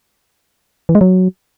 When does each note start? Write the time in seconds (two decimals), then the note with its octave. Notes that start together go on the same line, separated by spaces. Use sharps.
0.89 E3
0.95 G#3
1.01 F#3